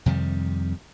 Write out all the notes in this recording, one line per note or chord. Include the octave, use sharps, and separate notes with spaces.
F2 C3 D#3 G3